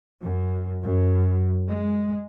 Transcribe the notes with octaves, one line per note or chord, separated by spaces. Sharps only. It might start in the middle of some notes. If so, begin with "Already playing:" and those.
F#2
F#2
G#3